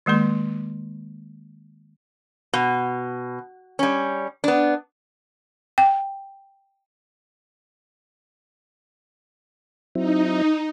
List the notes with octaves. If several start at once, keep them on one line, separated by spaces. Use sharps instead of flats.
D#3 G#3 A#3 C6
B2
G3 C#4
B3 D4
G5
F#3 C4 D#4 E4